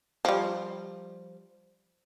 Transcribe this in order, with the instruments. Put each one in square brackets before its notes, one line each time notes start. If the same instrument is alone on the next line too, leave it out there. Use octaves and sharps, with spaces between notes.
[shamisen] F3 G3